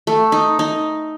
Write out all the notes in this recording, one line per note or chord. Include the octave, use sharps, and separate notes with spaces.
A3
D#4
D#4